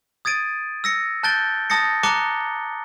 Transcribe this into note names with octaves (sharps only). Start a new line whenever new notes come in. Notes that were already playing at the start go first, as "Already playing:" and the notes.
D#6 G#6 A6 D7 D#7
E6 A#6 C#7
A5 F#6 G6 A6 D7 G7
A5 D#6 A6 A#6 C#7
A5 A#5 D6 F#6 C#7 G7